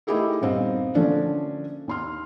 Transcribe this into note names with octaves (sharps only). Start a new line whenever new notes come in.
A3 D#4 E4 G4 G#4 A#4
D#1 G2 B3 C4 D#4 F5
D3 F3 A3 A#3 C#4 D4
D#2 C6 F6